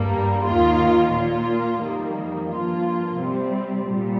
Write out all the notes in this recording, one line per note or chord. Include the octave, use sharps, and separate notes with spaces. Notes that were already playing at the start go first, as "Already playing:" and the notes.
Already playing: G2 G3 A#3
D#2 D#3 A#3 F4
A#2 A#3 F4
F2 D#3 G3 A#3
G2 F3 A#3 F4
C3 G3 C4
A#2 G3